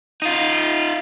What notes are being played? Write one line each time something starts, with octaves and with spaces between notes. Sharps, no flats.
D#4 F4